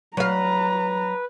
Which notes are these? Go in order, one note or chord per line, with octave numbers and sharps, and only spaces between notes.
F#3 B4 F5 A#5